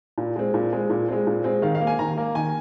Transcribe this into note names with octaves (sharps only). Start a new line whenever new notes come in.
A#2
G#3 C4
A#2
G#3 C4
A#2
G#3 C4
A#2
G#3 C4
D#3 F5
F5
A#3
G#5
D#3 A#5
A#3
D#3 G#5